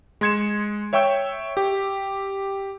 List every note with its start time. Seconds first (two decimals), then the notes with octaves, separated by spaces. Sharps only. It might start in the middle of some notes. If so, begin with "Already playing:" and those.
0.21 G#3 C6 G#6 C#7 E7
0.93 C#5 E5 G5 C#6 E6 G6
1.57 G4